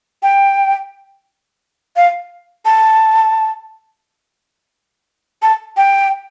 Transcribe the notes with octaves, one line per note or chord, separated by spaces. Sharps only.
G5
F5
A5
A5
G5